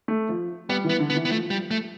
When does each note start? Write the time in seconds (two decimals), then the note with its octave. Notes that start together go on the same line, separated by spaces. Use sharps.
0.08 A3
0.29 F3
0.69 G3 B3
0.84 E3 B3
1.00 D3
1.10 B3
1.15 E3
1.25 B3
1.30 F3 A3
1.50 G3
1.71 A3